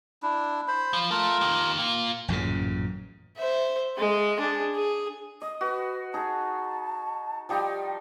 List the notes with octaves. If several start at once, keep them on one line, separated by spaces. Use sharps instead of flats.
D4 E4
C5 B5
F3
A3 F4 A#4
D#3 G4
A#3 F4
A1 F#2 A#2 C#3
C5 E5
G#3 C6
D4 G#4
G#4
D#5 D#6
F#4 B4
D#4 G#4 A5
F3 G3 D#4 G5